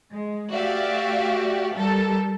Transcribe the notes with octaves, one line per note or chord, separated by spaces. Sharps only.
G#3
A3 F#4 G4 D5 E5 F5
G3 A4 A#4